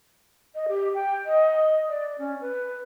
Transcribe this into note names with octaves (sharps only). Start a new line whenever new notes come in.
D#5
G4
G5
D#5
D5
C#4
B4